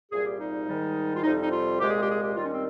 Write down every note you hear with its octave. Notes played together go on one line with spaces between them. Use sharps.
C2 A#2 G3 G#4
G4
D#4
G#2 D#3 G3
F4
F2 C3 G3 D#4
D#4
F4
C2 A#2 G#3 G4
G#4
G4
G#4
G4
D#2 D#3 G3 F4
C#4
C4